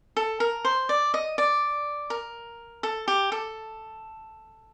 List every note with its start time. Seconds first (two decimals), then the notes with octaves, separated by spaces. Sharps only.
0.17 A4
0.40 A#4
0.65 C5
0.89 D5
1.14 D#5
1.38 D5
2.10 A#4
2.83 A4
3.08 G4
3.32 A4